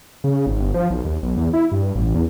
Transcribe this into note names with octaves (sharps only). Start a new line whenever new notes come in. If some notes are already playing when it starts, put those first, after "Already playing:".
C#3
G#1
G1
F3
B1
D#2
B1
E2
E4
G2
A1
E2